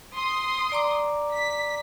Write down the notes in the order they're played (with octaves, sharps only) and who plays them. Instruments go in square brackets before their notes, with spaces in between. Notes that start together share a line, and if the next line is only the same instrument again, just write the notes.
[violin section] C6 D#6
[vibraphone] D5 A#5 D6
[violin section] B6